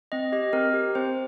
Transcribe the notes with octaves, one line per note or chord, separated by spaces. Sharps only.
C4 D#5
G4 D#5
C4 A#4
G4
C4 C5